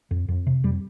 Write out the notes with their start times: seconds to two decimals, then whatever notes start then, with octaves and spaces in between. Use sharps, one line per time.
0.11 F2
0.28 F2
0.47 C3
0.64 F2 G3